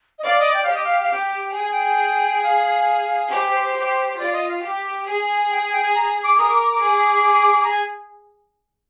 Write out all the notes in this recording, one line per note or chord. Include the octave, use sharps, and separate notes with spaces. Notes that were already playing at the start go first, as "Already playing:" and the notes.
D#5
D5 F5
D#5
G5
G4 F5
D#5
F5
F5
G4 G5
G#4 G5
G#5
G5
F5
G4 C5
C5
C5
G4
C5
F4 D5
D#5
F5
G4
G#4
G5
G#5
G5
G#5
A#5
D6
A#4 D#6
D6
D6
D6
G#4
A#5
G#5